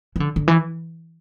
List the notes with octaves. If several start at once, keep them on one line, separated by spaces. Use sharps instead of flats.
E3
D3
D3
E3